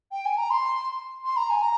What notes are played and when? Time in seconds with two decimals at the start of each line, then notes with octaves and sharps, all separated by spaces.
0.12 G5
0.25 G#5
0.37 A#5
0.50 C6
1.24 C6
1.36 A#5
1.50 G#5
1.62 A#5